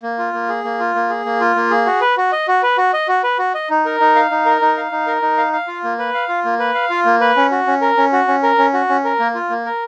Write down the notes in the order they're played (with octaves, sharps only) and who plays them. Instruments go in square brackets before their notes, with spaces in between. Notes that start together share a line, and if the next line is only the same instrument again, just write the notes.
[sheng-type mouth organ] A#3
F4
A#3
G#4
A#3
F4
A#3
G#4
A#3
F4
A#3
G#4
F#4
B4
F#4
D#5
F#4
B4
F#4
D#5
F#4
B4
F#4
D#5
D#4
A#4
D#4
F5
D#4
A#4
D#4
F5
D#4
A#4
D#4
F5
F5
F4
A#3
B4
F5
F4
A#3
B4
F5
F4
A#3
B4
C#4
F#4
C#4
A#4
C#4
F#4
C#4
A#4
C#4
F#4
C#4
A#4
A#3
F4
A#3
A#4